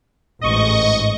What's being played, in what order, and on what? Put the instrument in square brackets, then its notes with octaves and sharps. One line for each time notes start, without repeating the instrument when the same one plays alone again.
[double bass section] A1 G#2 [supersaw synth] D#5 C#6